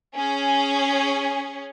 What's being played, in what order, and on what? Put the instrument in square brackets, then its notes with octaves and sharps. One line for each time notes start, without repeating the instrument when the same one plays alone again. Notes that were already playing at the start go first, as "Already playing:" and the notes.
[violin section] C#4 G#4